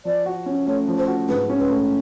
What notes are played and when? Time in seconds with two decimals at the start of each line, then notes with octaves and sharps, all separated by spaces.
0.05 F3 D5
0.26 F#4
0.46 C#4
0.66 A3 C#5
0.88 F3
0.98 C5
1.08 F#4
1.29 G#2 B4
1.50 C#4
1.59 B4
1.69 A3